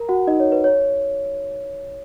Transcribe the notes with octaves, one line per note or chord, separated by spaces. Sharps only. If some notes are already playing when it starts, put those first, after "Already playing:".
Already playing: A#4 A#5
F#4 F#5
D#4 D#5
C#5
B4
C#5